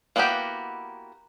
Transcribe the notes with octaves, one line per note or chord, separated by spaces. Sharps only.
A#3 B3 E4 F#4 G4